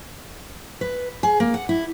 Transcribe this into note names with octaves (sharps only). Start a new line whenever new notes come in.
B4
G#4
A#3
F#5
E4